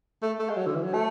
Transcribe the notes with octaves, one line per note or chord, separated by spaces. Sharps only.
A3
A3
G#3
F#3
D3
E3
F#3
A3